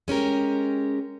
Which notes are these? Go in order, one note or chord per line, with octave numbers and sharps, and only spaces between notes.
G#3 C#4 G4 A#4